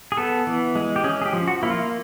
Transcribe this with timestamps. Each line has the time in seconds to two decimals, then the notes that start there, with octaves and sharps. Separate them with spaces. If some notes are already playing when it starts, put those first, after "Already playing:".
0.12 G#4
0.17 B3 A4
0.47 E3
0.75 G#3
0.96 G4
1.04 C#4 G#4
1.22 G#4
1.26 G4
1.33 F3
1.48 F#4
1.63 A#3 E4
1.70 F4